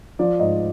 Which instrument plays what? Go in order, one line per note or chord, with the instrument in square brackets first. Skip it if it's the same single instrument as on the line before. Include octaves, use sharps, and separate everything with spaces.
[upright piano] F3 D5
G#2 D#5